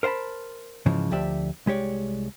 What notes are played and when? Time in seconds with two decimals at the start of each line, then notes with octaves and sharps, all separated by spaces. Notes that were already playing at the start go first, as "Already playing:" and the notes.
0.03 A#4 C5 F5 A5 B5
0.86 G#2 C#3 E3 F3
1.11 D2 F3 G4 D5 E5
1.66 C2 G#3 G4 C#5 D5